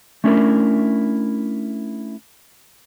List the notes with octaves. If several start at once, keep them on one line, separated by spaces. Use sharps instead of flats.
A3 C#4 D4 E4 F#4 A#4